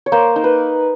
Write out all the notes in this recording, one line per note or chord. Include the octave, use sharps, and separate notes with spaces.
C#5
A#3 C5
D#4
B4